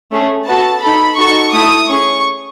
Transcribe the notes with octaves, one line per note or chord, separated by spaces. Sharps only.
A3 C#4 G#4
B3 F#4 A4 A5
D#4 A4 B5
D#4 F#4 A4 C#6
A3 E4 A4 D#6
C#4 G#4 C#6